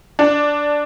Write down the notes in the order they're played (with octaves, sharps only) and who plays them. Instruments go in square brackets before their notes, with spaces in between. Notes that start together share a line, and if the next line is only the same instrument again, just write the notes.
[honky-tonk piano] D4